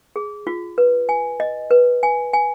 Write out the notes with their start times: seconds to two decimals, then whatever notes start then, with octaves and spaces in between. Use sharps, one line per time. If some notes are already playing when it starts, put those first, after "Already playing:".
0.16 G#4
0.47 F4
0.78 B4
1.09 G#5
1.40 D#5
1.71 B4
2.03 G#5
2.33 G#5